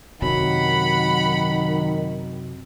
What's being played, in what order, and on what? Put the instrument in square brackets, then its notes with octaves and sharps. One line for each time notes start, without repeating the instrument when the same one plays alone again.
[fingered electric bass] F#2 C3 F#3 [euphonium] D#3 [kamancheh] F#5 B5